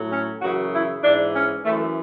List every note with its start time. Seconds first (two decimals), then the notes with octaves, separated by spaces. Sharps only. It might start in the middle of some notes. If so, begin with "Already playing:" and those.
Already playing: A2 F#3
0.11 C#4
0.41 F#2 C#3 E3 F#4
0.72 E4
1.03 G#2 E3 D4
1.34 C#4
1.65 E3 A3
1.69 F#2